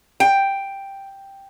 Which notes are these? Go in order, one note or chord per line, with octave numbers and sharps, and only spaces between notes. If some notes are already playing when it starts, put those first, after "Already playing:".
G5